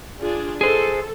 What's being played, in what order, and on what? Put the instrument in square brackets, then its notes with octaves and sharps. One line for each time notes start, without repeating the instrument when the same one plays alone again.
[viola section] D4 F4 G#4
[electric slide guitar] G#4 C5 [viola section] A4